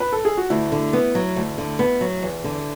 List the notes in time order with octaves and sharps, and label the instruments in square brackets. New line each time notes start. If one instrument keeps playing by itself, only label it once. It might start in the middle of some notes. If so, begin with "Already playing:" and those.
[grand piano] B4
A4
G#4
F#4
[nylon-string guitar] D2 [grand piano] E4
[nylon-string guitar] D3
B3
F#3
D2
D3
B3
F#3
E2
D3